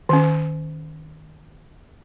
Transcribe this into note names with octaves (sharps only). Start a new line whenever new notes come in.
D#3 C#4